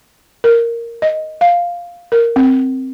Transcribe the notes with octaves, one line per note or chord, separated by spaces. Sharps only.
A#4
D#5
F5
A#4
C4